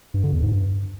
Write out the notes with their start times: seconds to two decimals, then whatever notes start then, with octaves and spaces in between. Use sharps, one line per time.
0.14 G2
0.23 D3
0.33 E2
0.42 G#2
0.52 G2